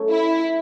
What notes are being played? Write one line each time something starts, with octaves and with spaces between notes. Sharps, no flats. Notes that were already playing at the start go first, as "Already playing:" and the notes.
Already playing: F#3 A3 C#4
E4